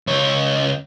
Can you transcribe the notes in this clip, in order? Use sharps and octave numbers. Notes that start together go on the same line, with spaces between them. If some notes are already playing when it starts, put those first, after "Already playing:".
C#2 C#5